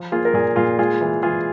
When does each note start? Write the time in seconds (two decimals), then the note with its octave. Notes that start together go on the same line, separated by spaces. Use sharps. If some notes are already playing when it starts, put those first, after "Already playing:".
Already playing: F3
0.12 A#3 F4 G#4
0.25 A#4
0.34 A#2 F4 G#4
0.56 A#2 F4 G#4
0.79 G#3 F4 G#4
1.01 E3
1.23 E3 F4 G#4